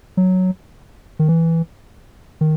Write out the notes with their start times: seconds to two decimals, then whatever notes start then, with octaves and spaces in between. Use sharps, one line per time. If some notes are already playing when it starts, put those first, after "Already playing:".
0.17 F#3
1.19 D#3
1.28 E3
2.41 D#3